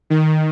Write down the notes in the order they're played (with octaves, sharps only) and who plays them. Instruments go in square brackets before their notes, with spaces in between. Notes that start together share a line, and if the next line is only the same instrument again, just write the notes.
[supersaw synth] D#3